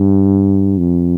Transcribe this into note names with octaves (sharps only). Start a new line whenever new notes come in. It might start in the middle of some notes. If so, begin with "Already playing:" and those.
Already playing: G2
F2